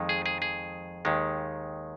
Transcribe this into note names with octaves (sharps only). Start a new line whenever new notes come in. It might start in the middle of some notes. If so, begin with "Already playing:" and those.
Already playing: F2 D#3 G#3
G#4
G#4
G#4
D#2 D#3 G#3